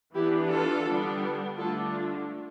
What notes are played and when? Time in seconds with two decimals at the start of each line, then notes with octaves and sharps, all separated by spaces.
0.14 E3 B3 D4 E4 G4
0.49 F4 A4
0.85 D3 G3 B3 D4
1.56 D3 A3 D4 F4 A4
1.92 F4